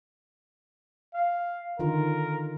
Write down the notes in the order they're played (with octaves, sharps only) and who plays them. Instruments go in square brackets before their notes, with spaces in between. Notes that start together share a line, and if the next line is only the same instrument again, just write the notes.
[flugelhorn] F5
[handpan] D3 D#3 F4 [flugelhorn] A#4